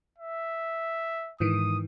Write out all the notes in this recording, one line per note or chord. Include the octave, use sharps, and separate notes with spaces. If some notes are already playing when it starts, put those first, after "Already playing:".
E5
G#2 D#3 E3 D#6